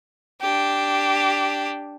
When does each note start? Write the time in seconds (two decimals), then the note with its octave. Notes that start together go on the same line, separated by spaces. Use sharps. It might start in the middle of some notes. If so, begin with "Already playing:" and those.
0.41 D4 G4